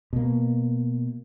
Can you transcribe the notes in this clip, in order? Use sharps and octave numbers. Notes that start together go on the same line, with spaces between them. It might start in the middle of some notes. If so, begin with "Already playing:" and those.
B2 A#3